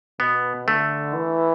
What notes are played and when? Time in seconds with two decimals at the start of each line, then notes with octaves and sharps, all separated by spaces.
0.20 B2 B3
0.68 D3 A3
1.15 E3